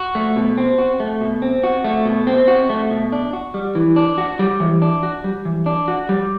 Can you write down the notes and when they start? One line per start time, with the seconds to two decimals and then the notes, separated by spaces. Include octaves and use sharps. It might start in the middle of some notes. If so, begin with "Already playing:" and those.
Already playing: F#4
0.15 A3
0.36 B2
0.58 C4
0.78 F#4
1.00 A3
1.21 B2
1.42 C4
1.64 F#4
1.84 A3
2.05 B2
2.27 C4
2.48 F#4
2.70 A3
2.90 B2
3.12 D4
3.33 F#4
3.54 G3
3.75 E3
3.96 D4
4.18 F#4
4.39 G3
4.60 E3
4.82 D4
5.03 F#4
5.24 G3
5.45 E3
5.66 D4
5.88 F#4
6.09 G3